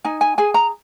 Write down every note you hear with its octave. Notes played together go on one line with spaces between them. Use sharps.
D#4 G#5
G#5
G#4 G#5
A#5